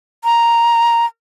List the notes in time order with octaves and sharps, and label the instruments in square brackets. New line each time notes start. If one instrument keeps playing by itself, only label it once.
[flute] A#5